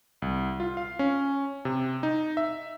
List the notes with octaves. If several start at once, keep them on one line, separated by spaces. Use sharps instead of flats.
C2
F4
F5
C#4
C3
D#4
E5